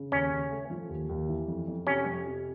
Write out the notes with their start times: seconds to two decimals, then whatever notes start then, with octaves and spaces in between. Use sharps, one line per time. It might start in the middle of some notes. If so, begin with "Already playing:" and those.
Already playing: C#3
0.12 D#2 C#4
0.31 C#3
0.50 A3
0.70 F3
0.89 D#2
1.09 D#2
1.28 E3
1.48 F2
1.67 F2
1.87 C3 C#4
2.06 F2
2.26 C3